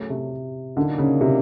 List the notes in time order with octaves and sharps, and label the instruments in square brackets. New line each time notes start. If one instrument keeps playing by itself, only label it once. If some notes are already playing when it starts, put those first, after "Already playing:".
Already playing: [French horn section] C#3 F#3 A3
[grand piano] C3
[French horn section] A#2 F#3 A#3 D#4 [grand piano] D3
[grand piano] C#3
C3